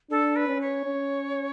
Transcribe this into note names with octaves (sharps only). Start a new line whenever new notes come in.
D4 A4
B4
C#4
C#5
C#4